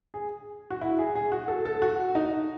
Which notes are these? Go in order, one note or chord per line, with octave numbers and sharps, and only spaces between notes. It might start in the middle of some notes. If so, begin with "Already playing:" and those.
G#4
F#4
E4
G#4
G#4
F#4
A4
A4
F#4
D#4